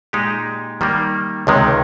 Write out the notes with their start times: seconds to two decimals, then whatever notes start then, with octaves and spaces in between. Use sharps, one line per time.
0.13 A#2 G#3 D#4 G4
0.81 D#3 G3 A#3
1.47 C#2 C3 D#3 G#3